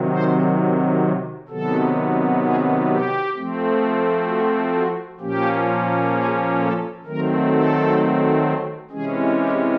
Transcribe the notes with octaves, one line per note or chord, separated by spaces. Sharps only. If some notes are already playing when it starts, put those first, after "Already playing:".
Already playing: C3 D#3 F#3
C5
C3 D#3 F#3 B3 A4
G#4
G4
F3 A3 C4
F#4
F#4
A#2 F3 A#3 C#4 G4
G#4
A4
D#3 F#3 A3 C4 A#4
A4
C3 E3 G#3 C#4 G#4
G4